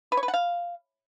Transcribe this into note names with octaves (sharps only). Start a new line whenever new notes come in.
B4
C#5
B4
F#5
F5